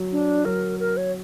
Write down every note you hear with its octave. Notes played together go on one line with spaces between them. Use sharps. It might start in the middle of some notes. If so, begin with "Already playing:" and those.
Already playing: F#3
D4
F#3 A#4
A#4
C#5